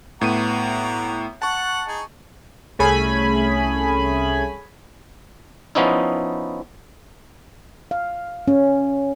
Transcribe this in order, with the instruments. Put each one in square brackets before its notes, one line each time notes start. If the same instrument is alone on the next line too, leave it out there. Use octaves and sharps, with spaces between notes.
[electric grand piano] A2 B3 D#7 [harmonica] F#4 A#5 D6
[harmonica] F#5 [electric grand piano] A5 C#6
[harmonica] D#4 G#4
[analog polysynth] C2 A3 C#4 G#4 G#5 B5
[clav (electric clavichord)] F3 B3 C#4 D#4 E4
[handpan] F5
C#4